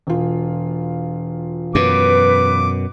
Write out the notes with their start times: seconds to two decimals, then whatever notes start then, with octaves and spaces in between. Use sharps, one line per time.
0.07 E1 F4
1.75 F#2 B2 B4 D6